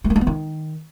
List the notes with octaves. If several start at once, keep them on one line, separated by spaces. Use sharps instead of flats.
G#3
A#3
G#3
B3
D#3